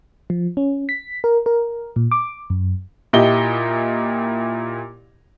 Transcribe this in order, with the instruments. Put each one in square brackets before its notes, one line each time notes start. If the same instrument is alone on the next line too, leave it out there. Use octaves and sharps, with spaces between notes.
[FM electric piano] F3
C#4
B6
A#4
A#4
A#2
D6
F#2
[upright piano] A#2 E4 G4 D#5 G7